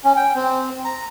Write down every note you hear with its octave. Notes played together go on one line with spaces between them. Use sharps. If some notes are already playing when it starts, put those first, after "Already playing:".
C#4
G5
C4
A#5